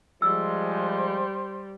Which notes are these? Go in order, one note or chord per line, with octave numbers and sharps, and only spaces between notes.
F3 G3 G#3 C5 E6